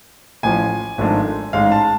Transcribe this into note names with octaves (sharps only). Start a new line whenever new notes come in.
A1 A2 F3 G#5
G#1 G#2 F3 A3 D4
A1 G#2 G#3 F5
A5